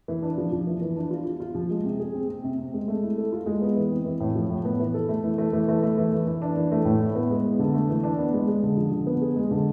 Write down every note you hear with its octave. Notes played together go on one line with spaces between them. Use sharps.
E3
D4
F3
F3
E3
E3
D4
F4
F4
F4
F3
G#3
C3
G#4
C4
C4
C3
C4
G#3
A3
E4
A4
F4
G#3
B3
E3
C4
E3
A2
F3
A2
B3
E3
A4
A3
E3
A3
E3
A3
A3
E3
E3
E3
D4
E3
A3
A2
E4
B3
G#3
B3
D3
A3
E3
D4
B3
G#3
G#3
D3
F3
D3
B3
G#4
G#3
D3